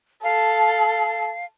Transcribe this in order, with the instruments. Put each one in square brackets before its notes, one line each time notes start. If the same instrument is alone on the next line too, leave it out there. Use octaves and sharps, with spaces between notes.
[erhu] A4 [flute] F5